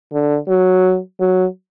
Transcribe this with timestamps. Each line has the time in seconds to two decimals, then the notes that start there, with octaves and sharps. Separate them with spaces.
0.13 D3
0.48 F#3
1.20 F#3